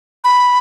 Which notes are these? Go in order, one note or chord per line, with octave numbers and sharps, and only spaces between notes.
B5